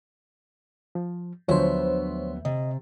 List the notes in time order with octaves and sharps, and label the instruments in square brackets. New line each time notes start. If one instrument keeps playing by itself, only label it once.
[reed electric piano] F3
[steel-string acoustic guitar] D2 B3 E5 [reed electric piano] F3 F#3 D4 [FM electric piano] C5 C#5
[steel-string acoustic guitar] C3 [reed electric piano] D#5